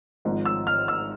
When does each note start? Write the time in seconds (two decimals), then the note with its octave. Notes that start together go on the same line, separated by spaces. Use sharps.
0.25 G#1 G#2 F3
0.45 E6
0.67 F6
0.88 E6